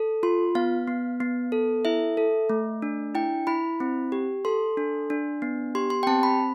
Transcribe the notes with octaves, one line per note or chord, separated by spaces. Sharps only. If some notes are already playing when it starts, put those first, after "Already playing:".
Already playing: A4
F4 C6
B3 F5
B3
B3
A4
E4 E5
A4
A3
D4
E4 G5
E4 B5
C4
G4
A4 C6
D4
D4
B3
G4 C6
C6
G5
C4 A5
B5